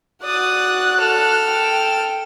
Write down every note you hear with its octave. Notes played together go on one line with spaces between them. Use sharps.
F#4 D5 D#6 F#6
A4 F6
G5